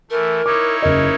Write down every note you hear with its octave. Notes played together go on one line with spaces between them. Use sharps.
E3 A3 A#4
D#4 E4 C#5 D6
F#1 A#4 D#5